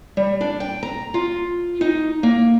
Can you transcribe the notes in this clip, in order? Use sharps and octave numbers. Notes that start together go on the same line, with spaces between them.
G3
D4
G5
A#5
F4
D#4
A#3